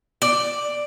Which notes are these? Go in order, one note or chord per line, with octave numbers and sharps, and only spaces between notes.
D5